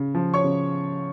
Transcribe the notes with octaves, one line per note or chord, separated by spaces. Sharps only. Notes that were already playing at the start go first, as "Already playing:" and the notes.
Already playing: C#3
F3
C#5 C#6
C#3